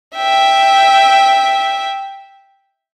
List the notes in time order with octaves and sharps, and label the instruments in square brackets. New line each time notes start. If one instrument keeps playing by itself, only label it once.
[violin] E5 G5